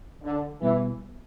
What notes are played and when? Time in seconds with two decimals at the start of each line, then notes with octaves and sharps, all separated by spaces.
0.22 D3
0.62 B2 E3 G3 B3